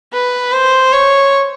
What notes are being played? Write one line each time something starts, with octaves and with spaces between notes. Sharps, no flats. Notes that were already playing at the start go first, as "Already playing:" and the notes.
B4
C5
C#5